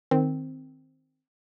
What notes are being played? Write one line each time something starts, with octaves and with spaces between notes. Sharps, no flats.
D#3 C4